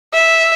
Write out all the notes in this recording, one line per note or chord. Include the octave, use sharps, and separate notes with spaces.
E5